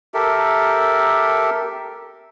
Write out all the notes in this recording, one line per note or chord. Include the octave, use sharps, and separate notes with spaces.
G4 A4 A#4 E5